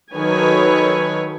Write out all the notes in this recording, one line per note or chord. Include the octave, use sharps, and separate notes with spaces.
D#3 F#3 A4 B4 C#5 G#5